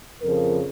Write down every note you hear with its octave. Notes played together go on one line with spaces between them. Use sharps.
F2 C#3 F3 A#4